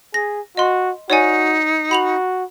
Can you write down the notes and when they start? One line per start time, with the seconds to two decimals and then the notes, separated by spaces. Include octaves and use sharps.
0.14 G#4 A#6
0.57 F#4 D#5 C6
1.10 D#4 F#4 C#5 D5 G#5
1.91 F#4 B5 F7 F#7